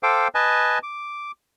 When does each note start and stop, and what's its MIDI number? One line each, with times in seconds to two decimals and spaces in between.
0.03 0.28 69
0.03 0.28 72
0.03 0.28 77
0.03 0.28 79
0.03 0.28 86
0.35 0.79 71
0.35 0.79 75
0.35 0.79 80
0.35 0.79 81
0.83 1.32 86